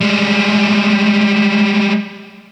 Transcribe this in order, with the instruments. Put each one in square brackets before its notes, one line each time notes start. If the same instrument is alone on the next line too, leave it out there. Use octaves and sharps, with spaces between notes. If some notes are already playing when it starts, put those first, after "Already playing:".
[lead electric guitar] G3 G#3